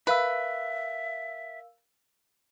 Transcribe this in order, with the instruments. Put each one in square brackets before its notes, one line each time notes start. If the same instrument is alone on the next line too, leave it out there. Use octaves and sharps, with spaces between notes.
[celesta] A#4 F5 E6 [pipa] B4 [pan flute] E5